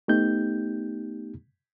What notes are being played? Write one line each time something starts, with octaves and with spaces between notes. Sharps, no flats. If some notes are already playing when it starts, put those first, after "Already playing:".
A3 B3 D#4 G4 G6